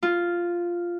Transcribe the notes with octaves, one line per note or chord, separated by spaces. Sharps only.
F4